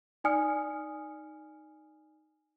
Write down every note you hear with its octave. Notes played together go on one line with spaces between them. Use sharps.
D#4 D5 G#5 D#6 F6 C#7